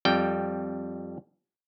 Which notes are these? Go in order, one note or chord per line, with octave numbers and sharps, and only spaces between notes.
F2 G3 G5